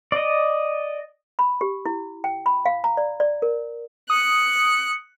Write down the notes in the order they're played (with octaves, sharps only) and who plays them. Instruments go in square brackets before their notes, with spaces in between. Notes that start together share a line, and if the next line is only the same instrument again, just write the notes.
[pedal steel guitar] D5 D#5
[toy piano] B5
G4
E4
G5
B5
F5
A#5
D5
D5
A#4
[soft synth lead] D#6 [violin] F#6 C#7